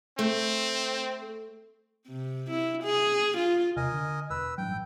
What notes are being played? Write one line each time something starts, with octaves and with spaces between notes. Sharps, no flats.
A3 C4
C3
E4
G#4
F4
E2 C3 A#4 D#5 G#5
D3
E1 B4 E6
A1 G2 F#3 G5